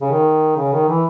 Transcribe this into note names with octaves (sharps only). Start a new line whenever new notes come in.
C#3
D#3
C#3
D#3
E3